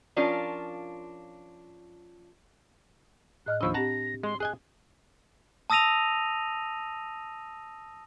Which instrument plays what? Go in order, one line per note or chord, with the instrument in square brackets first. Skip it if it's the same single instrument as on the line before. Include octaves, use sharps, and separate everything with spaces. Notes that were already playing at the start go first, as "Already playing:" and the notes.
[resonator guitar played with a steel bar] F3 C#4 D4 F4 A#4
[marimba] A2 D#5 F6 [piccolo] F#6
[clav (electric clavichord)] D#2 F3 D#5 [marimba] D4 B5 C#6 [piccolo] E6
[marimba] C4 G4 [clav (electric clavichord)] F#5 A5 A#5 [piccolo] A#6
[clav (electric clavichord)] G#3 [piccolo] C6
[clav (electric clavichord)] G#4 D#5 G#5 [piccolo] F#6
[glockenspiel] A5 D#6 E6 A#6 D#7 F7